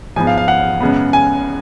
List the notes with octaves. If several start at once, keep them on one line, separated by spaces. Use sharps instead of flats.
G#2 F3 G#3 B3 G#5
F5
F5
F#5
F#2 C#3 G#3 B3
G#5